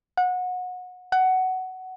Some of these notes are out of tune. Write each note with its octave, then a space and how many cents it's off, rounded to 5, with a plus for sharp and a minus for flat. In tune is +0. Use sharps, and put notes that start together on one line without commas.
F#5 -25
F#5 +15